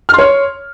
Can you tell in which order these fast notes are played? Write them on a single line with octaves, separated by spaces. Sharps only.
F6 C6 C#5